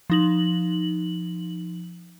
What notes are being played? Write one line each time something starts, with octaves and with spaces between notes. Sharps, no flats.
F3 D#4 F#7